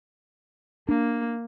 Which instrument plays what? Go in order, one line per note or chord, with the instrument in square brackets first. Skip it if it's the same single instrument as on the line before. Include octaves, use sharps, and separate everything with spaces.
[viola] A#3 [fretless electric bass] D4